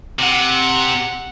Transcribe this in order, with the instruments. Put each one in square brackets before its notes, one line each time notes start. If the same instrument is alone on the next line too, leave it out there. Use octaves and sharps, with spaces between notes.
[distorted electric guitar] C3 [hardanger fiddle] F#5